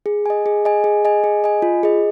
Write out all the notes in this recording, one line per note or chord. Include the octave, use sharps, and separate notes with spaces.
G#4
D#5 G#5
G#4
D#5 G#5
G#4
D#5 G#5
G#4
D#5 G#5
F4
G#4 D#5